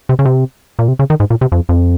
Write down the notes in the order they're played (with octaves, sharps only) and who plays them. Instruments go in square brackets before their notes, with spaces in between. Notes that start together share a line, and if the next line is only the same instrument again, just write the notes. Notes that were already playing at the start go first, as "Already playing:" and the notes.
[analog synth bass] C3
C#3
C3
A#2
C3
C#3
D#3
G#2
A#2
C3
F2
F2